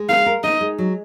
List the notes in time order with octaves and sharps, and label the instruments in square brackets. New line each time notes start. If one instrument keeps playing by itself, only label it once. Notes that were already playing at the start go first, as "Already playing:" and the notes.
Already playing: [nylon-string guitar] G#3
[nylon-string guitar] A#4 [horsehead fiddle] F5
[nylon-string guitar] A#4
[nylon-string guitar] D#4 [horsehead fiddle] D#5
[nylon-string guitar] G#3
F#3